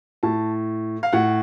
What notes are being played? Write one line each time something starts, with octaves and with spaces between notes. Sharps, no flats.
A2 A5
F5
A2 F#5